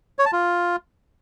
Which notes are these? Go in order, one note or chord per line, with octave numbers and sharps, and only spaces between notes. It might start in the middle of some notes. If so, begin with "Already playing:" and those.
C#5
A5
F4